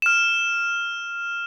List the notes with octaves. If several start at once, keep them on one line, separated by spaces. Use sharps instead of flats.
F6 E7